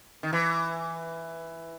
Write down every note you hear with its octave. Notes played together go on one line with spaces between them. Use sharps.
D#3
E3